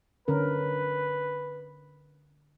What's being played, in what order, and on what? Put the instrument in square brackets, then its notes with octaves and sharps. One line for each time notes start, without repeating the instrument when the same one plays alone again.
[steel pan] D3 C#4 A#4 [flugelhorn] B4